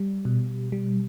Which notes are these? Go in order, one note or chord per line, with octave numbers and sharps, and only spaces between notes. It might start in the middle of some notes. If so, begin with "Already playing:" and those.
Already playing: G3
B2
G3